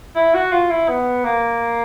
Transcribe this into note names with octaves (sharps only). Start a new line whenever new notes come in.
E4
F#4
F4
E4
B3
A#3